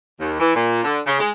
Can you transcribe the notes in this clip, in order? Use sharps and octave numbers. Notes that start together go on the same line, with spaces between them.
D#2
E3
A#2
D3
C#3
G#3